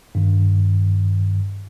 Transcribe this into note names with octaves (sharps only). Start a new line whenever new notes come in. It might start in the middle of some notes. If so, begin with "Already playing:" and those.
G2 D#3